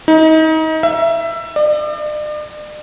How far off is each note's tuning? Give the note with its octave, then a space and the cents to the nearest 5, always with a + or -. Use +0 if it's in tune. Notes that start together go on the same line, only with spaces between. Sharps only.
D#4 +30
E5 +20
D5 +40